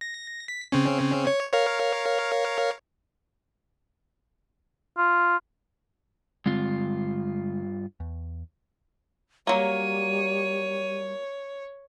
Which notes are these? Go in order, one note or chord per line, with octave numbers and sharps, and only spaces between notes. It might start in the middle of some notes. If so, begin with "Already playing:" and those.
A#6
B6
C#3 C4 C#4
C#5
A#4 C#5 F5
F4
G2 D3 G#3 C4 F4
E2
F#3 G3 A#3 C#5 D#7